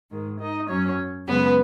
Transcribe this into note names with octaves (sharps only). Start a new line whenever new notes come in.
G#2 D#3 G#3
D#4 D#5
F#2 F#3 C#4 C#5
F#2 C#3 G#3 B3 B4